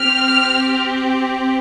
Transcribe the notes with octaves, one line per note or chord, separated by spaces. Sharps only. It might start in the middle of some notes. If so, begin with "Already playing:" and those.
Already playing: C4 G4 F6